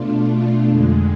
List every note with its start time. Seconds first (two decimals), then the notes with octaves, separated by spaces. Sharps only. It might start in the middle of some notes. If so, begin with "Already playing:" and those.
Already playing: B2 A3 D4 F4
0.69 F2 D3 G#3